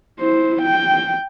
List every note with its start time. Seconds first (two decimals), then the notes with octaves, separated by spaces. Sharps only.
0.20 E4 C5
0.62 G5